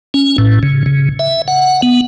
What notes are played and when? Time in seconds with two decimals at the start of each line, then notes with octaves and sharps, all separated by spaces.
0.14 C#4
0.38 A2
0.63 C#3
0.86 C#3
1.19 E5
1.48 F#5
1.82 B3